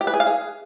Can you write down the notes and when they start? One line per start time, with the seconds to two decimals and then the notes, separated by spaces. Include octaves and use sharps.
0.01 G4
0.07 B4
0.14 G#4
0.20 F5
0.26 G#4